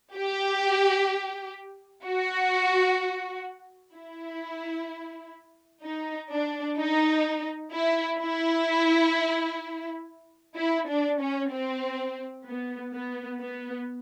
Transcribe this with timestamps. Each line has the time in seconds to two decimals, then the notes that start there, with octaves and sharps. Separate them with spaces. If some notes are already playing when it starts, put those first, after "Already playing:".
0.16 G4
2.05 F#4
3.94 E4
5.83 D#4
6.31 D4
6.78 D#4
7.73 E4
8.20 E4
10.57 E4
10.88 D4
11.20 C#4
11.51 C4
12.45 B3
12.93 B3
13.40 B3